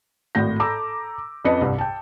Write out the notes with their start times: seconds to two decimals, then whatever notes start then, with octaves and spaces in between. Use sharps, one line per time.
0.35 G#1 A2 F#4 G6 A#6
0.60 A4 A#5 B5 D6 E6
1.45 F2 C#4 B4 D#5 A5 C#7
1.61 C2 G2
1.78 G5 A5